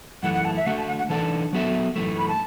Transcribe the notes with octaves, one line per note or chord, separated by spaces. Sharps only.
F#2 E3 A3 F#5
F#5
A5
E5
D3 A3 F#4 A4 F#5
A5
F#5
F#5
E3 D4 A4 D5 A5
F#3 B3 F#4 A4 E5
F#2 E3 A3
B5
A5